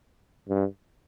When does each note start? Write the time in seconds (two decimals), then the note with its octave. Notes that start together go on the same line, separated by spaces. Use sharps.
0.49 G2